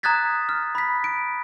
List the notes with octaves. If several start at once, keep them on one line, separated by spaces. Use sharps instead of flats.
A#5 D#6 F#6 G#6 A6 B6
F6
B5 B6
D7